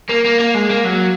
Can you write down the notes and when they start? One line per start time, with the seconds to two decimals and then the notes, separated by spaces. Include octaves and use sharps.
0.09 A#3
0.25 A#3
0.39 A#3
0.54 G#3
0.70 A#3
0.85 F#3